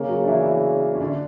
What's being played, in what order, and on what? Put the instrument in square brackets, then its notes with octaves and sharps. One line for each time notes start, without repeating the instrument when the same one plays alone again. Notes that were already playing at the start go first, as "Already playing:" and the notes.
Already playing: [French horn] C#3 [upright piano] A#3 A#4
[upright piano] F#3 F#4
D4
E3 E4
E3 E4
C#4
D3 D4